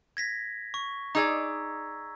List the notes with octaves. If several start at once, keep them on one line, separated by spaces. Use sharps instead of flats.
G#6 A#6 B6
C#6
D#4 G#4 D5 A#5 E6 G#6